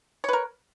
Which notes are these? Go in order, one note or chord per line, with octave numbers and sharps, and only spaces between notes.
A#4 B4 C#5